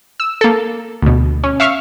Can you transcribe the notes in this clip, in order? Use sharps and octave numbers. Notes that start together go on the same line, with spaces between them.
E6
A#3 A4
D2 B2
C#4
E5 F5 C#6 F6